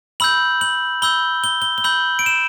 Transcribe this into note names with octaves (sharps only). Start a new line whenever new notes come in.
B5 E6 G6 F#7
F#7
B5 E6 G6 G7
G7
G7
G7
B5 E6 G6 F#7
D7
E7